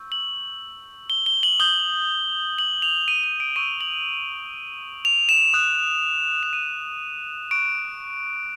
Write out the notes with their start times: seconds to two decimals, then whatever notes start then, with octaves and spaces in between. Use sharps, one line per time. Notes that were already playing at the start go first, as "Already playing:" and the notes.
Already playing: C#6 E6 G6
0.12 F#7
1.10 G7
1.26 G7
1.43 F#7
1.60 D#6 G6 G7
2.58 F#7
2.82 F7
3.08 D#7
3.24 D#7
3.40 D7
3.56 C#6 E6 G6 D#7
3.81 F#7
5.05 F7
5.29 E7
5.53 D#6 F#6
6.43 E7
6.53 D#7
7.51 C#6 F#6 D7